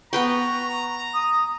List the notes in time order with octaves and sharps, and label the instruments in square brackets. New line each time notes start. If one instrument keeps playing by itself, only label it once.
[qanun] B3 B4 G5 [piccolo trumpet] A#5 [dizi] C#6
[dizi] D#6